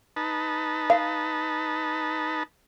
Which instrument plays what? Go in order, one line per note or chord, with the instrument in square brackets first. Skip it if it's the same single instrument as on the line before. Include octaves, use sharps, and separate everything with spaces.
[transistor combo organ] D#4 B4 A5
[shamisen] F5